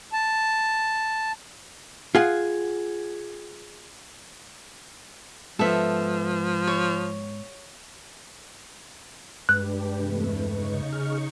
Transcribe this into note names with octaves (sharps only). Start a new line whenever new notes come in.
A5
F4 G#4 F#5
G#2 F3 B3 A4 E5
C#5
G2 G#3 D4 G4 B4 F#6
E2 C3 A3
C#3 D#4 C#6
G#4 F6